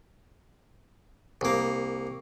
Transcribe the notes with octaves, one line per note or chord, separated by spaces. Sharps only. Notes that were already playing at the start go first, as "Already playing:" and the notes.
C2 A#3